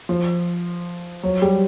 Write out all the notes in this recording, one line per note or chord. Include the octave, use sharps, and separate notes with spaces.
F3
F#3
G3